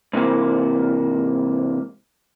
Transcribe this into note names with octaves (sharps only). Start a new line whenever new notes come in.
G#2 C3 E3 A#3